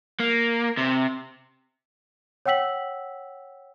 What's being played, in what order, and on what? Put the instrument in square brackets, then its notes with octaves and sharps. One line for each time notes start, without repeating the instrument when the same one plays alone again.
[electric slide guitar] A#3
C3
[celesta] C#5 F#5 G5 E6 B6 F#7